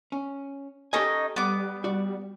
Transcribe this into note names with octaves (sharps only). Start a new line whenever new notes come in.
C#4
C#4 D#4 G4 A4 D#5 G#5
G3 B3 D6
F#4 D5